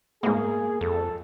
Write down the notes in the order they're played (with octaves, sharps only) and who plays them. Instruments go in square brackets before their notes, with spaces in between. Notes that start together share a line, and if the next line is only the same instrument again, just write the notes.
[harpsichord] G#2 B2 [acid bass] A#3 [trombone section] G#4
[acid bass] F2 [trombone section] A4